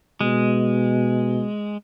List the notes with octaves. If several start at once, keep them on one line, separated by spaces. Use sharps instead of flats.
B2 G#3